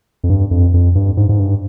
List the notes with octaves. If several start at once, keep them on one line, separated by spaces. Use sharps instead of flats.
F2
G2
F2
F2
G2
G#2
G#2
G2